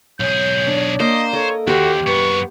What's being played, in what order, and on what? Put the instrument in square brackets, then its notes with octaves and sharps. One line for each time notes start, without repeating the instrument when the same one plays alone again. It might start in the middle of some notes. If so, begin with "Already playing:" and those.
[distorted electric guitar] B1 G#4 [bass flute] C#5 [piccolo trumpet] G6
[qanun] D4
[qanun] A#3 [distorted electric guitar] C5 [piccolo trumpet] D#5
[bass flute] A4 [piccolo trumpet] C#5 [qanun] D#5
[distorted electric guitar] D#2 [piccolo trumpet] F#4 [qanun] G4 C5
[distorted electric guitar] F#2 B3 [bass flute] B4 [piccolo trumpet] C#6